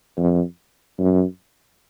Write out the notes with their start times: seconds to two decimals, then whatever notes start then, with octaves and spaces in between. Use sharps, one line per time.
0.17 F2
0.99 F#2